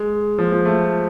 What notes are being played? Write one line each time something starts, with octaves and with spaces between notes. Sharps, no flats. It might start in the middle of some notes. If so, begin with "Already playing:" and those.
Already playing: G#3
F3
F3
A3